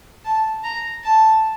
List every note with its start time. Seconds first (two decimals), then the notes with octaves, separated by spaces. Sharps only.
0.25 A5
0.64 A#5
1.04 A5